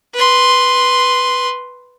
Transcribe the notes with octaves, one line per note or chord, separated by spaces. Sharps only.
B4 C6